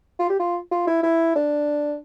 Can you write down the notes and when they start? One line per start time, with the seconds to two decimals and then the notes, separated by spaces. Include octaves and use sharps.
0.19 F4
0.29 G4
0.39 F4
0.72 F4
0.87 E4
1.03 E4
1.35 D4